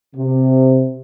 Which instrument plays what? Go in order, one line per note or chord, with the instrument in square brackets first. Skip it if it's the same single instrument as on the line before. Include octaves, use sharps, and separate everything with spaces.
[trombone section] C3